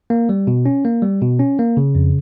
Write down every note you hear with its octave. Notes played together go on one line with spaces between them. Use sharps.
A#3
G3
B2
C#4
A#3
G3
B2
C#4
A#3
C#3
F2